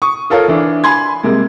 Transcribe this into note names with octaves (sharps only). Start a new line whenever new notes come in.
C#6 D#6
F4 A4 A#4 C#5 F5
E3 D4
G#5 B5 C6 G#6
C3 G3 G#3 A#3